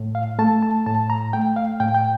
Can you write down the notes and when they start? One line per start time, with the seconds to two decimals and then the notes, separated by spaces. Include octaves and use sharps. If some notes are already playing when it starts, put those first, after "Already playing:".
Already playing: A2
0.15 F5
0.39 A3 A5
0.63 A5
0.86 A2 A5
1.10 A#5
1.33 A3 G5
1.56 F5
1.80 A2 G5
1.95 G5